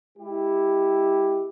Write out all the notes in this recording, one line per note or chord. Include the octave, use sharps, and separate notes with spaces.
G#3 E4 G4